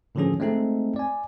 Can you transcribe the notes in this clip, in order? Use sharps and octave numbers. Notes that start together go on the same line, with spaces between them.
A2 D3 D#3 F3 C#4 G#4
G#3 A3 C4 D#4 A4
D5 G#5